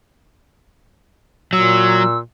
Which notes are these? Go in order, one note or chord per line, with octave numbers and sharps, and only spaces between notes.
A#2 F#3 E6